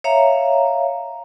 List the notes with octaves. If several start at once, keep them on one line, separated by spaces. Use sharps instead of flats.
C#5 E5 F5 A#5